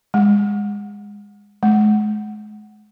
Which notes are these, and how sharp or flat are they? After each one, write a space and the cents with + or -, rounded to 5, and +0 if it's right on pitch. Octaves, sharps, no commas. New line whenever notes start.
G#3 -20
G#3 +35